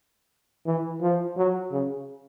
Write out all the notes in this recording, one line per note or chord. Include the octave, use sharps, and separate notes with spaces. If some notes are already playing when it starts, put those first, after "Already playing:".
E3
F3
F#3
C#3